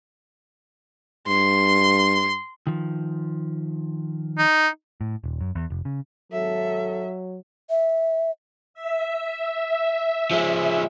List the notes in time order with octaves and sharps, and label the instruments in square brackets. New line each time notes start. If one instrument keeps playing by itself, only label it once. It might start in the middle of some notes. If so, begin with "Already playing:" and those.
[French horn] G2 [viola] C6
[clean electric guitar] D#3 F3
[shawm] D#4
[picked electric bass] A2
D#1
F#2
E2
F1
C#3
[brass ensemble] G#1 A4 [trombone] F#3 [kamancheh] E5
[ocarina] E5
[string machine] E5
[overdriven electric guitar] F3 G#3